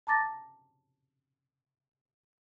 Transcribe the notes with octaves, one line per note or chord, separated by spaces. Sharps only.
A5 A#5 D6 A6 A#6